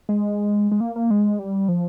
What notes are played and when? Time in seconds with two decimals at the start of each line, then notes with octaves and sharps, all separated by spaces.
0.09 G#3
0.72 G#3
0.80 A#3
0.96 A#3
1.10 G#3
1.39 G3
1.68 F3